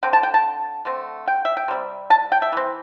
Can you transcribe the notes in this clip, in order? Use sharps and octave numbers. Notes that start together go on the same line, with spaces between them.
D3 C4 G5
A5
G5
A5
D3 A3 C4
G5
E5
G5
C3 G3 C4
A5
G5
E5
E3 C4